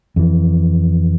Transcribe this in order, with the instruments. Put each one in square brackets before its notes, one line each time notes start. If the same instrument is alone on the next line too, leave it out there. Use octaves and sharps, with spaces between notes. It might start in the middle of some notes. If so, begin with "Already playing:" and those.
[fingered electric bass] F2 E3